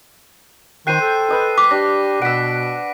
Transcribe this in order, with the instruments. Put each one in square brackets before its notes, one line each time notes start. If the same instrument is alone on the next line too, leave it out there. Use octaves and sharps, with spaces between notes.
[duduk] D#3 [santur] C5 G5 [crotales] F#6 C7 D#7
[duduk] A4
[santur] B4 D#5 A5
[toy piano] D6 [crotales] B6
[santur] D4 [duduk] G4 [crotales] A#6
[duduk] B2 [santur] F#5 E6 [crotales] B6 D7